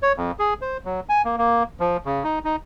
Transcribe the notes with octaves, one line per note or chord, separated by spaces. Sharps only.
C#5
F2
G#4
C5
F#3
G#5
A#3
A#3
F3
C#3
D#4
D#4